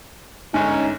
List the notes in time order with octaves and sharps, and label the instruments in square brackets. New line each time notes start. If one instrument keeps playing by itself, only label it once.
[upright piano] G1 G#2 [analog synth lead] C#4 [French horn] D#4